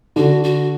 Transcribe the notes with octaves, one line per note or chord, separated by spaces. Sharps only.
D3 D4 F#4
F#4